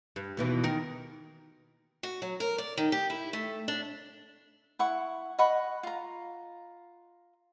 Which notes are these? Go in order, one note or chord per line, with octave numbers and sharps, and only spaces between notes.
G2
D#2 B2 E3
D#3 A#4
F#4
F#3
A#4
D5
D#3
G4
E4
A3
D4
E4 F#5 C#6
D#5 F#5 B5 C#6
F4 A#5